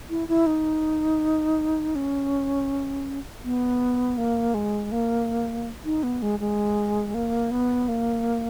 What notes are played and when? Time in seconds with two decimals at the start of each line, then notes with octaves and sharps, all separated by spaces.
0.10 E4
0.28 E4
0.46 D#4
1.95 C#4
3.44 B3
4.18 A#3
4.54 G#3
4.92 A#3
5.85 D#4
6.03 B3
6.22 G#3
6.40 G#3
7.14 A#3
7.51 B3
7.88 A#3